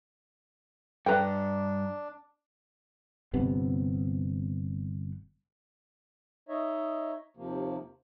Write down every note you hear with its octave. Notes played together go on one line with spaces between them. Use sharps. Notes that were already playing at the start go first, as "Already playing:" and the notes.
G2 D4 B4 G5 A#5
G1 C3 B3
D#4 C#5 D#5 E5
D#2 C3 F3 A#3